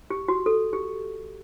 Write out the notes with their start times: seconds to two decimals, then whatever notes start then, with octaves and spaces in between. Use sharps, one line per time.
0.10 G4
0.28 F#4
0.46 A4
0.73 G4